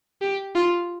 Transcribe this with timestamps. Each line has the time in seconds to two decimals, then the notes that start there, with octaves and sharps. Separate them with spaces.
0.22 G4
0.55 F4